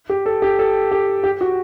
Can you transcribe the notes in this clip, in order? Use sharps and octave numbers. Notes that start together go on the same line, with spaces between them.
G4
A4
G4
A4
G4
G4
F#4